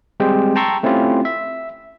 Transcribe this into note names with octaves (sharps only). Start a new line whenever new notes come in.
G3 G#3 C4 G4 G#4 C5
G5 A5 A#5 C6 C#6 E6
A3 C4 C#4 E4 F4 G4
E5